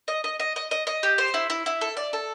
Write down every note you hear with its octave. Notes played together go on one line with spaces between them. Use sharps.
D#5
D#5
D#5
D#5
D#5
D#5
G4
C5
E4
E4
E4
A4
D5
A4